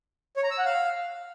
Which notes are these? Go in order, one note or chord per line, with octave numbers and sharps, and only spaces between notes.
C#5
A#5
E6
F#5
F5